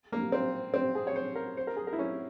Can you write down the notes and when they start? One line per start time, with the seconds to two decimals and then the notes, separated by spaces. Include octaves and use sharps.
0.12 A#3
0.32 C4
0.74 C4
0.95 G#4
1.07 C#5
1.16 C5
1.36 A#4
1.57 C5
1.67 A#4
1.76 G#4
1.87 A#4
1.93 E4
1.99 C#4